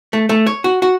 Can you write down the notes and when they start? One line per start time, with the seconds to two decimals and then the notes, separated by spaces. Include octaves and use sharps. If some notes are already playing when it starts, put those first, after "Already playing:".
0.13 A3
0.29 A3
0.47 C#5
0.64 F#4
0.82 F#4